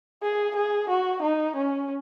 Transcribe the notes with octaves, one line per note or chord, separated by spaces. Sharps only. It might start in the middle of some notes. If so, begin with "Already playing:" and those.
G#4
G#4
F#4
D#4
C#4